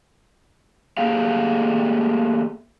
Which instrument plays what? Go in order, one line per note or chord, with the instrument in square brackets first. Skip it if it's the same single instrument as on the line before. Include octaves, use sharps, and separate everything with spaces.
[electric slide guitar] A3 A#3 G4 G#4 F5